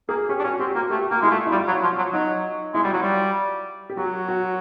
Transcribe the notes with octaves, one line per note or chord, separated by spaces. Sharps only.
A#3 G#4
C#4 G4
D4
C#4 F#4
C4 G4
A#3 F#4
A3 G4
A#3 F#4
G#3 E4
A3 F4
E4
G3 F4
F#3
F#4
F3
F4
F#3
F#3 D#4
G#3 E4
G3 F#4
F#3 F4
G3
G4
F#3 F#4
F#4